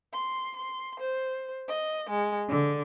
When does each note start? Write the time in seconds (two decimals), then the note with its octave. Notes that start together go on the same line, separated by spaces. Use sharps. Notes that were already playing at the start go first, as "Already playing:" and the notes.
0.13 C6
0.54 C6
0.99 C5
1.68 D#5
2.09 G#3
2.47 D3